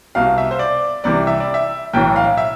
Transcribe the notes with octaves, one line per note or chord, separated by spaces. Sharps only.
C2 B2 F5
E5
C5
D5
C2 C3 E3 D5
E5
D5
E5
B1 A2 E3 G5
F5
E5